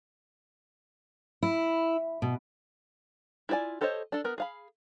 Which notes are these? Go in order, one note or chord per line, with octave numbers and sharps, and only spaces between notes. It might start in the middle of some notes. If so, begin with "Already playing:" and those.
E4
B2
E4 F4 B4 D5 G#5
G4 A4 C5 C#5 D#5
D4 A4
B3 A#4
G#4 F5 B5